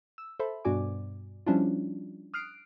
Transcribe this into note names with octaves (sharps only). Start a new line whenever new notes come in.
E6
A4 C5 E5 B5
G2 B2 F#4 D5 G#5 D6
F3 G3 C#4 D4 E4 F4
D#6 F6 F#6 C7 D7